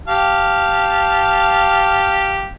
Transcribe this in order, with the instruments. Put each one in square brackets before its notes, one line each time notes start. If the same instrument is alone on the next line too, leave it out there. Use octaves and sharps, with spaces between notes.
[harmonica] G4 F5 A5